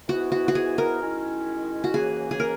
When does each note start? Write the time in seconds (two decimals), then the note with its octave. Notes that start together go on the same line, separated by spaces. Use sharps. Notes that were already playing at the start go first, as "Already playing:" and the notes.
0.08 G#2 E3 B3 E4 F#4
0.32 F#4
0.48 F#4
0.55 G#4
0.78 A#4
1.01 D#3 G#3 C#4 E4
1.84 F#4
1.93 D#2 C#3 E3 A#3 C#4 G#4
2.31 G#4
2.40 A#4